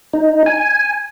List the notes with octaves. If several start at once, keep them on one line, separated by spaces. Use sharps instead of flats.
D#4
G#5